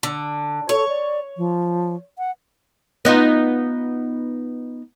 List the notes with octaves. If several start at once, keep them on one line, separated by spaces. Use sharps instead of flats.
D3
A4 C#5
D5
F3
F#5
B3 D#4 F4